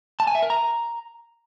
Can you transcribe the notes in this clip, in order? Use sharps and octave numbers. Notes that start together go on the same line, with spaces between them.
A5
G#5
E5
A#4
A#5